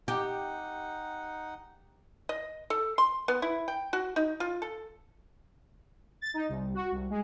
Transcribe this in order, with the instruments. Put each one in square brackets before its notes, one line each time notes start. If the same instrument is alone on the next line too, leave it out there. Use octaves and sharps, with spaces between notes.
[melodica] D#4 F#5 [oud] G4
[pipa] D#5
A4
C6
B3
E4
G5
F#4
D#4
F4
A4
[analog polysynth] A6
D#4
C2
F#4
C2
G#3